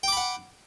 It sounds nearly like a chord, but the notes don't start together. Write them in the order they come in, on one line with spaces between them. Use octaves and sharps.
G5 D6 B5 F#5